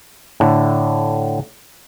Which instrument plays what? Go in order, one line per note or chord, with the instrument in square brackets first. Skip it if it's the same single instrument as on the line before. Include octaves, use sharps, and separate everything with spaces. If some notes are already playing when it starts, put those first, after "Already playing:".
[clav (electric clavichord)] A2 D3